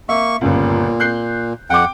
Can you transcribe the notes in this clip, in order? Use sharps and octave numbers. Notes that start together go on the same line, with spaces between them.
A#3 E5 C#6
G1 C#2 A#2
F#6 G6 C7
F2 F#5 G5 D6